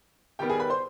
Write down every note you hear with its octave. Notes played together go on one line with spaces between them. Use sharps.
D#3 G3 B3 G4 G5
G#4 G#5
B4 B5
C5 C6